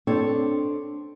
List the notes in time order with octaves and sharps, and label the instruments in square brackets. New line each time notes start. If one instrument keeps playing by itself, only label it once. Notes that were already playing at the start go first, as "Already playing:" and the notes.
[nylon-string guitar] C4 D4 A4 C#5